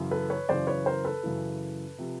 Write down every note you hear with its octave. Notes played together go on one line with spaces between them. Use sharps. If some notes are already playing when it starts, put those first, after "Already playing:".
Already playing: F#2 C#3 E3
A4 B4
B4 C#5
F#2 C#3 E3 C5 D5
B4 C#5
A#4 C5
A4 B4
F#2 C#3 E3
C3 F3